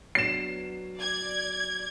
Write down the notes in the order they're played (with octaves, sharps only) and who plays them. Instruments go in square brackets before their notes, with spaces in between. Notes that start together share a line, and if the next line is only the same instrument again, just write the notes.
[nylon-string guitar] F#3 B3 D4 [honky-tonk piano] C7 E7
[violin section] D5 G#6